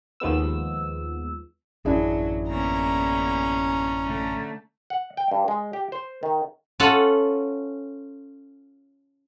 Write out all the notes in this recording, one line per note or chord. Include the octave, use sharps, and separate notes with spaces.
D#2 F3 G#3 B3 E6
A1 F#2 F#3 D4 E4 G#4
A#3 B3 C#4 A#5
D3 A3
F#5
G5
G2
G#3
G4
C5
D#3
C#4 F4 A4 F#5 A5